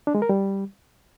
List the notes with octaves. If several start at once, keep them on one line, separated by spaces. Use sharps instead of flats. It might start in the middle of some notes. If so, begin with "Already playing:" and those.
D4
G#3
A#4
G3